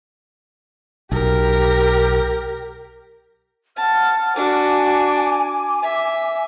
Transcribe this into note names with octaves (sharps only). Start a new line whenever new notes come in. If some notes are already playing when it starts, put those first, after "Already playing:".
B1 G4 A#4
F#5 A5 F6
D4 F#4 G#5 D6
E5